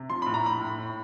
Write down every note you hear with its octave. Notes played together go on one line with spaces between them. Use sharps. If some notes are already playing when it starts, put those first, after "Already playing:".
Already playing: C3
F3 C6
A2 B5
A#5
A2 B5
A2
A2